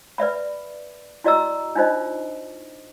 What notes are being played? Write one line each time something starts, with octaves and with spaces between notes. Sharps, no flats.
B4 D5 E5 B5
E4 F#4 D5 D#5 A#5 E6
D4 D#4 F4 C5 D#5